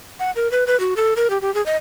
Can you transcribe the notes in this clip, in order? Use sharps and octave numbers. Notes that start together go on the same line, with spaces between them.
F#5
A#4
B4
B4
F#4
A4
A#4
G4
G4
G#4
D#5